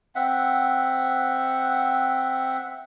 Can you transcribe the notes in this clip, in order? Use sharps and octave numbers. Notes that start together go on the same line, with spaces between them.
C4 E5 F#5